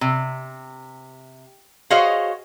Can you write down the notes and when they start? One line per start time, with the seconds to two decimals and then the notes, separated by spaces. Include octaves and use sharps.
0.01 C3
1.90 F#4 G#4 C5 C#5 D#5 F5